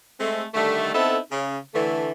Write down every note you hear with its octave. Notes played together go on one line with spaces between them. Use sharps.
G#3 A3 C4
D3 D#3 G3 A3
B3 C4 D#4 E4 A4
C#3
D3 E3 A3